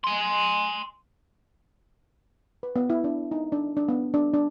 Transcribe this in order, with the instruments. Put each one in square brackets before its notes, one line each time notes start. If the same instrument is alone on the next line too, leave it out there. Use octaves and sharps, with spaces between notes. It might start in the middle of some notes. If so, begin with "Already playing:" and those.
[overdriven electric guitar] G#5 C6
[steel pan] B4
B3
E4
D4
D#4
D4
D4
B3
D4
D4